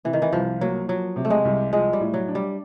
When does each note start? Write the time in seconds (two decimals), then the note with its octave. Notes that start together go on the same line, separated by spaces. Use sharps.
0.05 C3 E3
0.13 D#3
0.22 E3
0.33 C2 F3
0.61 F#3 A#3
0.88 F3 F#3
1.16 C3
1.25 A3
1.30 G#3
1.45 C2
1.72 F3 G#3
1.93 G3
2.00 A2
2.14 F#3
2.28 D4
2.35 G3